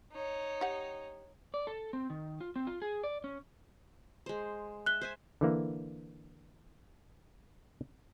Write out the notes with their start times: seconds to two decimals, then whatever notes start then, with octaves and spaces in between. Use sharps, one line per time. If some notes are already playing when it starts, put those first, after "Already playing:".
0.13 D#4 C#5
0.61 G4 F#5
1.54 D5
1.67 A4
1.93 C4
2.10 D#3
2.41 F4
2.56 C4
2.67 F4
2.82 G#4
3.04 D5
3.24 C#4
4.26 G#3 C5
4.86 E5 F#6 G7
5.01 C5 E5 G#5
5.41 D3 E3 A#3